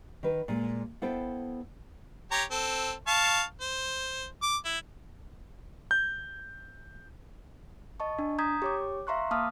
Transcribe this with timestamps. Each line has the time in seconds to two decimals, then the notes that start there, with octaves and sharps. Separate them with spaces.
0.23 D#3 B4
0.48 A#2 G#3
1.02 B3 E4 A4 C5 F5 G5
2.31 G4 C#5 A#5
2.51 C4 A4
3.07 F5 A5 C#6
3.61 C5
4.43 D6
4.65 E4
5.91 G6
8.00 D#5 A5 C#6
8.19 D4
8.39 A#5 D#6 G6 G#6 B6
8.62 G4 C#5 D6
9.07 E5 F5 A#5 C6 C#6 F#6
9.31 A#3 F5 A5 D6 D#6 F6